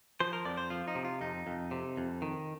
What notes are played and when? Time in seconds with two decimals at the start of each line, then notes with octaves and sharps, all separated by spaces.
0.20 F3 C5
0.33 A#4
0.45 F2 D5
0.58 C5
0.70 F3 F4
0.88 D#4
0.95 C3
1.05 F4
1.21 F2 D#4
1.47 F2
1.71 C3
1.97 F2
2.22 D#3